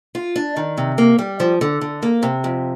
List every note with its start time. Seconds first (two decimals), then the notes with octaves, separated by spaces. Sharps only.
0.15 F4
0.36 D4
0.57 D#3
0.77 C3
0.98 A#3
1.19 G3
1.40 F3
1.61 D3
1.81 D3
2.02 A#3
2.23 C3
2.44 F2